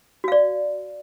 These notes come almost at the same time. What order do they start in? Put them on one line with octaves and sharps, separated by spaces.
F#4 F5 D5